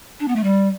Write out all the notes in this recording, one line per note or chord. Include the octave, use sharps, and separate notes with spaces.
D4
B3
A3
G3